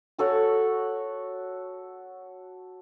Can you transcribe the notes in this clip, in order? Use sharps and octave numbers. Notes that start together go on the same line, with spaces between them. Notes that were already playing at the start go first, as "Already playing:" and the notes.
F#4 A4 C#5 F#5